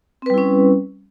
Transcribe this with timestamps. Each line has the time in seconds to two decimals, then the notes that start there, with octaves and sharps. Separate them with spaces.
0.22 C4
0.26 B4
0.30 G3
0.34 E4
0.38 C#4